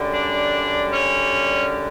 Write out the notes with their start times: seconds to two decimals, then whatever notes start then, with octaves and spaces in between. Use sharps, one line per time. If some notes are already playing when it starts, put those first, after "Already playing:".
Already playing: F#2 D3 G3
0.12 D4
0.93 C#4